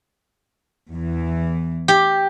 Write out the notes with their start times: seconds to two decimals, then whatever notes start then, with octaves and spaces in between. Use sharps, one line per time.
0.91 E2 E3
1.88 G4